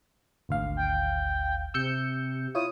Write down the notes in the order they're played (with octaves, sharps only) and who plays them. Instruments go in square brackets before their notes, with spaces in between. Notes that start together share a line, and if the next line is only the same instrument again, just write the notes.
[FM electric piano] G#1 D2 F5
[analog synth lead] G5
[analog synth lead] C3 [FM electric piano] E6 G6 C#7
[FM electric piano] E4 F4 C#5 [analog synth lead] D#6